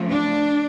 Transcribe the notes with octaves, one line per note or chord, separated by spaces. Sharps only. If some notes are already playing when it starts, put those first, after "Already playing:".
Already playing: C#3 F3 A3
D4